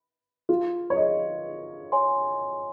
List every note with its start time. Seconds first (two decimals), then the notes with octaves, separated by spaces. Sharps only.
0.49 F4
0.90 C#5
0.96 D#5
1.92 C#5 G#5 C6